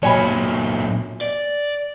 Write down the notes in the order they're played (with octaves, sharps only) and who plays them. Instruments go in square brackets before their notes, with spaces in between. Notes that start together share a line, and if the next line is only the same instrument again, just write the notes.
[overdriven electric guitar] A#2 F#3 [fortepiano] C#5 G#5 B5
[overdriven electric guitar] D5